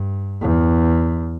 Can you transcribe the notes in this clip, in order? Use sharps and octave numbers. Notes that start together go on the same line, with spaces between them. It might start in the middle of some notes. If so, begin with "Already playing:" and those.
Already playing: G2
E2